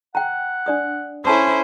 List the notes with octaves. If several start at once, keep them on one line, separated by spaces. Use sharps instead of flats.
F#5 G5 A#5
D4 D5 D#6
C#4 E4 A4 C5 A5 D#6